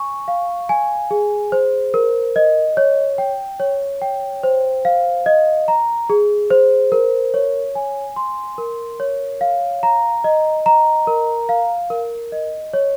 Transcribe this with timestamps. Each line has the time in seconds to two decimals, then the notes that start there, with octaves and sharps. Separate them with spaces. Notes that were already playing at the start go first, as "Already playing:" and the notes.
Already playing: G#5 C#6
0.28 F5
0.69 G#5
1.11 G#4
1.52 C5
1.94 A#4
2.36 D#5
2.77 C#5
3.18 G5
3.60 C#5
4.02 G5
4.43 C5
4.85 F5
5.26 D#5
5.68 A#5
6.10 G#4
6.50 C5
6.92 A#4
7.34 C#5
7.75 G#5
8.16 C6
8.58 A#4
9.00 C#5
9.41 F5
9.83 A#5
10.24 D#5
10.66 A#5
11.07 A#4
11.49 F5
11.90 A#4
12.32 D#5
12.73 C#5